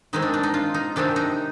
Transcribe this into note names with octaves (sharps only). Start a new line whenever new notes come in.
D#3 G#3 C4 D#4
D4
D4
D#4
F4
D#4
C3 D#3 G#3 C4 D4
D#4